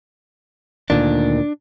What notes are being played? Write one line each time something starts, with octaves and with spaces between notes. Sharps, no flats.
D2 A#2 D#3 D4